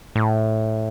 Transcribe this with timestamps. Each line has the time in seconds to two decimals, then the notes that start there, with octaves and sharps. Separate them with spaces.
0.16 A2